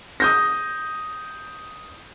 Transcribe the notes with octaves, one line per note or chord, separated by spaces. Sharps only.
D#6 G6 A#6